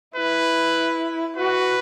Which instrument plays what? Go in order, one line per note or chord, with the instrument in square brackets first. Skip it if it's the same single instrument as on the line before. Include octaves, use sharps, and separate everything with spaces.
[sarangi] E4 [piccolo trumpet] B4
[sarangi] F#4 [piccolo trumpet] B4